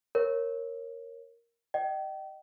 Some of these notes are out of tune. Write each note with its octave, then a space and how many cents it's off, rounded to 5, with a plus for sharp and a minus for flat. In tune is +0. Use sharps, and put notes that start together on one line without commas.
A#4 +0 C#5 -15
D#5 -25 G5 -35